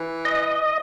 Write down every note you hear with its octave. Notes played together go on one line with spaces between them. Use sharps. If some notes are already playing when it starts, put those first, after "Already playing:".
Already playing: E3
D#5